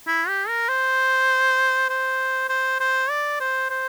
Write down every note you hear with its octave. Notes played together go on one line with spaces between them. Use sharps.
E4
G4
A#4
C5
C5
C5
C5
D5
C5
C5